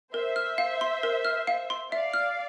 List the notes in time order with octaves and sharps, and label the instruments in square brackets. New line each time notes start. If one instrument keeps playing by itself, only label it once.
[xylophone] A#4 [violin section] C5 E5
[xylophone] F6
F5
C6
A#4
F6
F5
C6
[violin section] D5 F5 [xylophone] E5
[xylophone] F6